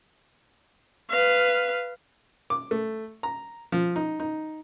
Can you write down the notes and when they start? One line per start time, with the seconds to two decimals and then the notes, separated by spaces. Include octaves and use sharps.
1.10 B4 F5
2.50 D6
2.71 A3
3.23 A#5
3.72 F3
3.96 D#4
4.20 D#4